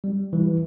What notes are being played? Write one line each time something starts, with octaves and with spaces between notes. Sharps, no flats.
G3
E3